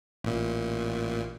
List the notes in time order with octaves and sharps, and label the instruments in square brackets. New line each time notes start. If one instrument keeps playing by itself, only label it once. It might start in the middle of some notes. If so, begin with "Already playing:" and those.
[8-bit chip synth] A1 A#2